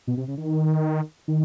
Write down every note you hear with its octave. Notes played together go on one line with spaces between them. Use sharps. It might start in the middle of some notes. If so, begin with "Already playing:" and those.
B2
C3
C#3
D#3
D#3